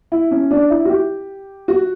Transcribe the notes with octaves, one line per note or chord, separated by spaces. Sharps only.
E4
C#4
D4
E4
F#4
G4
F#4